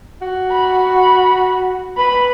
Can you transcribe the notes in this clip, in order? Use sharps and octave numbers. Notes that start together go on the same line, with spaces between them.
F#4
B5
B4 B5